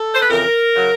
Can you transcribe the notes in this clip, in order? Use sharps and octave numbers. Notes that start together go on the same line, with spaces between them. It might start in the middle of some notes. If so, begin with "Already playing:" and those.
Already playing: A4
C5
B4
F2 C#3 E3 A#4
C#3 F#3